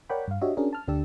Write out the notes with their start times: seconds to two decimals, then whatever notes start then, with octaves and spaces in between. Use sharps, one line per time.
0.09 A#4 C#5 D5 F#5 G5 B5
0.28 G2 F5
0.41 D4 F#4 G4 C#5 D#5 E5
0.57 C#4 D4 F#4 G#4 A#4
0.73 A5 F6
0.88 D2 D3 D4 G4 A5 E6